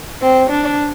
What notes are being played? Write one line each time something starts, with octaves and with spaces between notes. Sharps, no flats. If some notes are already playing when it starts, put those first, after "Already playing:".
C4
D4